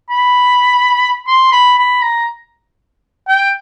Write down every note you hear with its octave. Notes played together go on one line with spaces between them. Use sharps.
B5
C6
B5
B5
A#5
G5